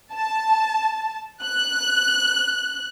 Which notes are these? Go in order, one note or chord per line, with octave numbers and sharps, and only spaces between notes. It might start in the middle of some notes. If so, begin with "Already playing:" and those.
A5
F#6